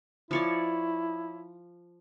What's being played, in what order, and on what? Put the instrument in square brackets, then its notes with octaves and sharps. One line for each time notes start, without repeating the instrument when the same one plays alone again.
[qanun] F3 C#5 D5 [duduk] E4